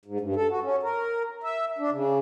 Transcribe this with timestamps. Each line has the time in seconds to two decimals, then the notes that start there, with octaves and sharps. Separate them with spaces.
0.05 G#2
0.20 G2
0.36 A4
0.49 F#4
0.63 C#4
0.83 A#4
1.44 E5
1.79 D4
1.92 C#3